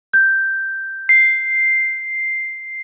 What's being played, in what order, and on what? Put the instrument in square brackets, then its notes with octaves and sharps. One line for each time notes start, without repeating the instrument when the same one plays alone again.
[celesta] G6
[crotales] C7